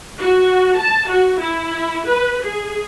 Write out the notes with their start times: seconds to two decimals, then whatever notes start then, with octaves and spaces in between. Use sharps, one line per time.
0.19 F#4
0.77 A5
1.08 F#4
1.39 E4
2.06 B4
2.42 G#4